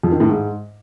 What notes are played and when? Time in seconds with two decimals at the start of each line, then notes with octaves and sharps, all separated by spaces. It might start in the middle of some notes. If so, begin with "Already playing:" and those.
0.03 F2
0.12 D#3
0.20 A2
0.29 G#2